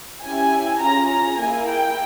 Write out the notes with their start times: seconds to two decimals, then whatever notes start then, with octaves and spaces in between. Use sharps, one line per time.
0.23 C#4 E4 G4 G#5
0.81 C#4 F4 G#4 A#5
1.11 A#5
1.39 A#3 E4 G#4 G#5
1.69 G5